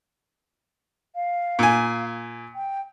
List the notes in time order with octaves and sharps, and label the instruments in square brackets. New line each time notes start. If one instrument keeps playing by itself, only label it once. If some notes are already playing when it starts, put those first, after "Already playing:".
[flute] F5
[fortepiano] A#2 G#5
[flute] G5